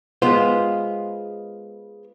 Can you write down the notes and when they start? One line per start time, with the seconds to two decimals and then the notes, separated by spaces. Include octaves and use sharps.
0.22 G#3 B3 F4 C5